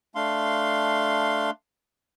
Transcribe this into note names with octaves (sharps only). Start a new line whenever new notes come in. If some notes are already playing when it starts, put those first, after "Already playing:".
A3 D4 F5 C6